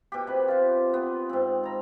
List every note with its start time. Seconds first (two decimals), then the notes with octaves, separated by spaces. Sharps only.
0.12 B2 G4
0.27 C3 B4
0.48 F4 C5
0.94 B3
1.29 G#2 C4
1.64 A#5 B5